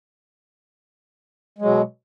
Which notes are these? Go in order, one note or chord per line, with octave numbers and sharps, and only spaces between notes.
B2 F#3 G#3